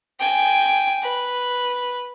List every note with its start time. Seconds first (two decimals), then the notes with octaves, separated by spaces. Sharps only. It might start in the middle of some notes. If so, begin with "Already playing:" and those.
0.19 G5 G#5
1.02 B4